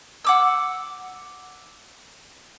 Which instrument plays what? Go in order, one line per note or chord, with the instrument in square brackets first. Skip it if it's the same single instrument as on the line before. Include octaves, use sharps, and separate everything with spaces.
[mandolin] F#5 D6 E6